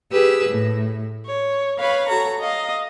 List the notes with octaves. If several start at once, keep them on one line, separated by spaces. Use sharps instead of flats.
G4 G#4 B4 E6
A2
C#5
B4 C#5 F5 B5
F#4 A4 C#5 A#5
D#5 F5